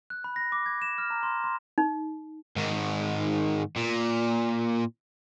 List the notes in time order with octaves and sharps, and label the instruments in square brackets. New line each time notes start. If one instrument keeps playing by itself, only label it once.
[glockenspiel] F#6
B5
A#6
D6
G#6
E7
F6
A#5
C6
C6
[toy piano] D#4
[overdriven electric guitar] G#2 D#3
A#2